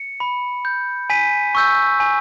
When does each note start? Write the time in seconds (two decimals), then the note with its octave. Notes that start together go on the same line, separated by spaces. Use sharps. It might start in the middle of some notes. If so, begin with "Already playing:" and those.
Already playing: C#7
0.20 B5
0.65 G6
1.10 G#5 B6 D#7
1.55 C#6 E6 G6
2.00 G#5